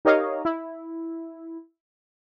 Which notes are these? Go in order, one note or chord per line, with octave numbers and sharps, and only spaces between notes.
D#4 G4 A#4 C#5 D#5 F5
E4